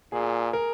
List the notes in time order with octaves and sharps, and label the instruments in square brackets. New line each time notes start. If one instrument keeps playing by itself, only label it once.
[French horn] A#2 [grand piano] G#4
[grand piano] A#4